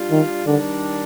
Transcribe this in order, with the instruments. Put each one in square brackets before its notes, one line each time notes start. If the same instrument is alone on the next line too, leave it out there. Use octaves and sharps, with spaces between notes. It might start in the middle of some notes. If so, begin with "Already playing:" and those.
Already playing: [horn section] G3 D4 F4
[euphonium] D#3
[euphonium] D3 [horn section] D#3 G3 D4